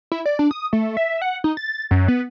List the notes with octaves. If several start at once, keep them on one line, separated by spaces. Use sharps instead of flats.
E4
D5
D4
D#6
A3
E5
F#5
D#4
A6
F#2
B3